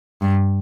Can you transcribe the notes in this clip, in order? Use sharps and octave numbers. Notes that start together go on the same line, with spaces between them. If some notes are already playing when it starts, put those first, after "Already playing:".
G2